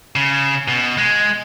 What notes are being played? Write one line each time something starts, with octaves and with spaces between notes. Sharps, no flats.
C#3
B2
G#3